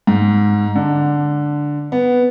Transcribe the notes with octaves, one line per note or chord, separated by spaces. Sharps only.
G#2
D3
B3